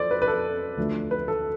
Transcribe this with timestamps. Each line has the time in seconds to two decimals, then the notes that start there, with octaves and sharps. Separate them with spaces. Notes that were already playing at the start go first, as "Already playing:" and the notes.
Already playing: F3 A4 C5 D5
0.11 B4
0.22 B4
0.27 A4
0.77 D2 D3 F3 A3
1.11 B4
1.28 A4